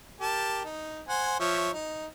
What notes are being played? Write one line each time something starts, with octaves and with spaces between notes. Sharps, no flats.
G4 A#4 A5
D#4
C5 F#5 G#5
F3 C#5 E5
D#4